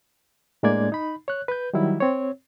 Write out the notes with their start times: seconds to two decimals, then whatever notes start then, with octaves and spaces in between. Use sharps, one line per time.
0.63 A2 G#3 A#3 D4 D5 G#6
0.92 D#4 B5
1.28 C#5 F#6
1.48 B4 G6
1.73 D#3 F#3 G3 E4
2.00 C4 C#5